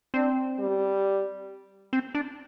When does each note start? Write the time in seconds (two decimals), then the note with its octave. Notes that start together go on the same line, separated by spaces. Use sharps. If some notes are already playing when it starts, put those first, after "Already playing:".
0.14 C4 D4
0.59 G3
1.93 C4
2.15 D4